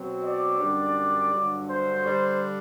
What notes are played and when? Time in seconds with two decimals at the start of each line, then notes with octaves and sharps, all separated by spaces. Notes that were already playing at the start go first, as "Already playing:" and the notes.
Already playing: B2 F#3 C4
0.23 D5
0.59 F#2 D3 G3 D4
1.32 G2 D3 F#3
1.69 C5
2.04 D3 G3 D4